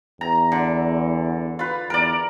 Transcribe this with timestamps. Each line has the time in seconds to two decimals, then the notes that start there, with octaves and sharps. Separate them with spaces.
0.21 E2 A#5
0.52 D3
1.59 F4 B4
1.90 E2 A#4 D5